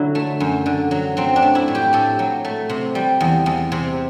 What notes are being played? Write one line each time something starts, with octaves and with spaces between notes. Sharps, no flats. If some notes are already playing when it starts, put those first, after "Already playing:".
Already playing: D3 F#3 E4 F#4
A3
F#2
D3
F#3
F#3 C4
D4
A3
E4
A2
G4
A2 A4
F#3
A3
C3
G3
E2
E2
C3